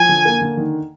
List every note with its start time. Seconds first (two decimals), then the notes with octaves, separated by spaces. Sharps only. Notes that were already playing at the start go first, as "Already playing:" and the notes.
Already playing: F3 G#5
0.09 D3
0.25 A#3
0.41 D3
0.57 D#3